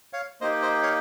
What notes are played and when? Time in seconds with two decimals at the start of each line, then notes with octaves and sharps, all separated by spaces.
0.13 C#5 F5
0.41 A#3 D#4 G4 C5 D#5
0.62 C5 D#5
0.83 C#5 F5